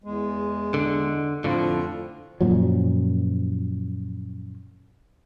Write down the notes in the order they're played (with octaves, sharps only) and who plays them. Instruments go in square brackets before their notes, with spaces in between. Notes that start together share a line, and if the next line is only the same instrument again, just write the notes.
[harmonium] E2 G#3
[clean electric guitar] D3
[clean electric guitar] F2 A2 D3 [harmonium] F3 F4
[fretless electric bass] F#2 A#2 F3 F#3